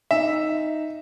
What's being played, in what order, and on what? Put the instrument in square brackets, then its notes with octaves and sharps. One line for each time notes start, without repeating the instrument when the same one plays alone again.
[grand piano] D#4 [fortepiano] E5